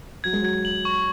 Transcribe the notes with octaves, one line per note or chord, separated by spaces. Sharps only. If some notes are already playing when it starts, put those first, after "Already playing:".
F#3 G#6
G#3
F#3 G#6
F#7
C#6